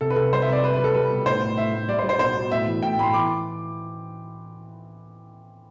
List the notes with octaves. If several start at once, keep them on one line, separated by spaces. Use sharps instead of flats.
C3 A4
B4
C3 A4
G3 C5
E5
C3 D5
G3 B4
B4
G3
A4
G3 B4
B2
A2 C5
A2
A2 E5
A2
G3 D5
C5
G3
C5
B2 C5
B2
A2 E5
E3
A2 G5
A2 B5
C6
E3 D6